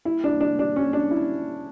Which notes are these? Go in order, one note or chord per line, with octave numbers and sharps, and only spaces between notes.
E4
D4
D4
D4
C#4
D4
E4